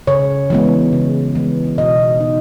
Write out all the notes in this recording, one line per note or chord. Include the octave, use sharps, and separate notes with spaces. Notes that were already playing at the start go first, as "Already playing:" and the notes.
C#3 C#5
E3 G#3 B3
C#3
E3 G#3 B3
B2 D#5
B3 D#4